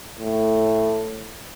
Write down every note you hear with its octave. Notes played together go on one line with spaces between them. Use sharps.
A2